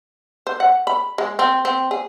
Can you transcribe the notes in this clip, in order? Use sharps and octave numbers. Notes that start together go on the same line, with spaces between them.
C5
F#5
B5
G#3
C4
C4
G#4